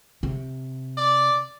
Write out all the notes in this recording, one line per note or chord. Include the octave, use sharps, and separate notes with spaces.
C3
D5